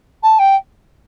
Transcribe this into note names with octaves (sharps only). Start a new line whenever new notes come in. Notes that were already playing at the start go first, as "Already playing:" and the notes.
A5
G5